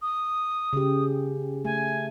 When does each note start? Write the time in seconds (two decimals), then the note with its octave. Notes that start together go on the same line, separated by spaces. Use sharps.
0.02 D#6
0.73 C#3 G4
1.65 A3 G#5